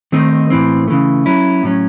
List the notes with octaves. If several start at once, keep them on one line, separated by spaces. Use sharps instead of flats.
D#3 A3 C4 D#4
A2 E3 C4
C#3 E3 A3
F#3 C#4 E4
A2 F#3 C#4